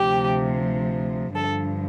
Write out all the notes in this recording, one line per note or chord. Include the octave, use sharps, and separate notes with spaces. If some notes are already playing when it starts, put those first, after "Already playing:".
Already playing: D2 C3 F3 G4
G2 D3 F3 A4